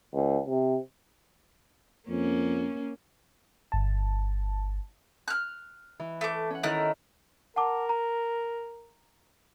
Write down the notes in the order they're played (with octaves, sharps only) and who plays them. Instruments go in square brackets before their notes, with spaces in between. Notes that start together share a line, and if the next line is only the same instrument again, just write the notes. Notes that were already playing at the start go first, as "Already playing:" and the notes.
[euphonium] C#2
C3
[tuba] F2 [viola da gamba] A#3 C#4
[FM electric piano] G1 A5
[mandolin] F6 F#6
[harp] E3
[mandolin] A3 D6
[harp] C#4 F#5
[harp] D#3 E4 E5 [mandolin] A3 A#4 F#6
[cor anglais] A#4 [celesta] F#5 A5 D6
[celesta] A#5